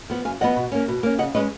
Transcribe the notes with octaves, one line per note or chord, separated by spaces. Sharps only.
F3 B3
F#2 F5 G#5
F3 B3 D#5 F#5
B2
A#3 C#4
B2
A#3 C#4
C#3 D#5 F#5
G#3 C#4 B4 D#5